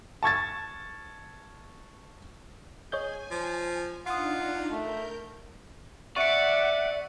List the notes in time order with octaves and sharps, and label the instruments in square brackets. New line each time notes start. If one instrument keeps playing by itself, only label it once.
[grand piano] A5 C#6 G#6 A6
[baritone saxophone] G#4 [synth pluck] C#5 D#5 G6 [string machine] G#5
[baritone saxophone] F3
[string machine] D4 D#4 [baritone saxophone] F4 [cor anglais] F#5 [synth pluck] C6 D#6
[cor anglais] A3 [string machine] A#4 G6
[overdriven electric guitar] D5 [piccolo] E5 [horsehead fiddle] F#5 [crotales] C#6 C#7